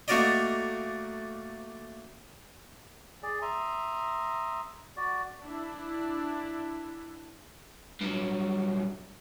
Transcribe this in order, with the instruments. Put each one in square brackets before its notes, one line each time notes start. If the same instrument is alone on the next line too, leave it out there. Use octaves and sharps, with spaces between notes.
[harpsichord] A3 A#3 F#4 A#4 D5 D#5
[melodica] G#4 D5
E5 A#5 C6 D#6
F#4 D5
[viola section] D4 E4
[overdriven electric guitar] G2 F#3